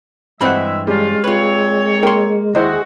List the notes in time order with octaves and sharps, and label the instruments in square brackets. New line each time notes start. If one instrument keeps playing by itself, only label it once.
[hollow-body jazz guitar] G2 E3 C4 [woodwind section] G#3 E5 [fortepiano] F#5 B5
[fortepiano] G3 [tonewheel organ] G#3 [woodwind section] C#4 D4 F4
[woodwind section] A#2 C4 C#5 [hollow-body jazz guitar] F4 B4
[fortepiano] A#3 [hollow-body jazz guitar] G5 C6
[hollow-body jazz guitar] D#2 [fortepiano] G#3 E4 C5 [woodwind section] F#4 [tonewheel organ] G#4